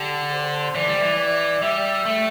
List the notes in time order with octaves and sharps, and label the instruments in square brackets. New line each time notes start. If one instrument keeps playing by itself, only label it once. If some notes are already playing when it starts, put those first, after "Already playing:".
Already playing: [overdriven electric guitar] D3 [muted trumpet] G4
[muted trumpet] C5
[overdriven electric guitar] E3 [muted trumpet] D5
[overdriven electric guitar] G3
E3
[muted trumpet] D5
[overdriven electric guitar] G3 [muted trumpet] E5
[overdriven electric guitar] A3